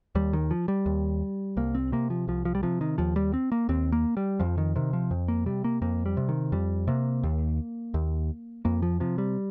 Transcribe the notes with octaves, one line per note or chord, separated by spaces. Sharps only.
D#2 G3
D#3
F3
G3
D#2
C2 A#3
C4
C3 A#3
F3
C2 F3
F3
G3
C3 F3
D#3
D#2 F3
G3
C4
A#3
D#2 C4
A#3
G3
F2 F3
D#3
C3 D#3
F3
F2
A#3
C3 G3
A#3
F2 A#3
G3
C3
D#3
F2 G3
C3 A#3
D#2
D#2
F2 A#3
F3
C3 F3
G3